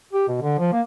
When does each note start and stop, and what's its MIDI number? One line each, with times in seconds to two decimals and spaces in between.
0.13 0.25 67
0.28 0.37 47
0.42 0.57 50
0.59 0.71 53
0.72 0.81 58